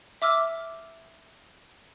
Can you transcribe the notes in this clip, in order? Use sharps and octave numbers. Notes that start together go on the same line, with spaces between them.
E5 D6 E6 F6